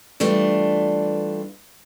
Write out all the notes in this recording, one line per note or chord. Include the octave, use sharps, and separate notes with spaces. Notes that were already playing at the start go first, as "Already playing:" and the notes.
E3 G3 A3 D4 F4